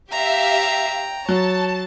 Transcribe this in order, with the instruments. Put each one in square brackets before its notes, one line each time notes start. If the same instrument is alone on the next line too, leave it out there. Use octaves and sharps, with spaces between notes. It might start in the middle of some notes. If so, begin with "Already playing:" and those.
[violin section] G4 E5 F5 [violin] G5 A#5
[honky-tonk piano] F#3 [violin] C#5 [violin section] A5